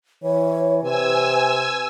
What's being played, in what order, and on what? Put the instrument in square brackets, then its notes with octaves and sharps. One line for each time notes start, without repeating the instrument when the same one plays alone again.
[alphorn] E3 [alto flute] C#5
[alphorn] C3 [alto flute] B4 [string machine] G#5 E6